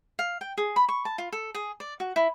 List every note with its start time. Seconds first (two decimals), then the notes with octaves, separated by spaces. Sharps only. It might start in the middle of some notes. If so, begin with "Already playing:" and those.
0.19 F5
0.41 G5
0.58 G#4
0.76 B5
0.89 C#6
1.05 A5
1.18 F4
1.32 A4
1.55 G#4
1.80 D5
2.00 F#4
2.16 E4